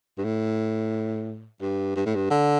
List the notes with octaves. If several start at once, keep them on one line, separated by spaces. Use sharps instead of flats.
G2
A2
G2
G2
A2
G2
D3